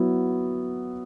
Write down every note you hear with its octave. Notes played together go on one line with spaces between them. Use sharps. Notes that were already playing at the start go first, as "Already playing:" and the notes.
Already playing: F#3 B3 E4